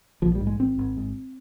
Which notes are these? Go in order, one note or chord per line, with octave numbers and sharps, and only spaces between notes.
A#1 F3
G3
G#2
G#3
G#1 C4
G#1
G#2